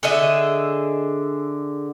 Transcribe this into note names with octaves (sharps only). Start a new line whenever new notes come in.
D3 G#4 D#5 E5